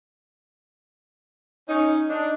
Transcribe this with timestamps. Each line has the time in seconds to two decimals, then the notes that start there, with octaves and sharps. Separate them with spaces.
1.69 C#4 D#4
2.10 D4 D#4